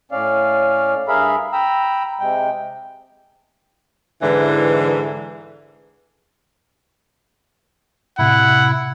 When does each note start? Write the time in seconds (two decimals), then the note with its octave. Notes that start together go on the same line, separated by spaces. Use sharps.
0.12 A2 C#4 D5 F5
1.08 G2 G#4 A#4 E5 F5 B5
1.53 G5 A#5 B5 E6
2.20 C3 G#3 G5
4.22 G#2 D3 E3
8.19 A2 C3 E4 F#5